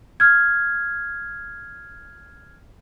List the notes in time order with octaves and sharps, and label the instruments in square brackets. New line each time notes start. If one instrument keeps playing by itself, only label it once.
[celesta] F6 G#6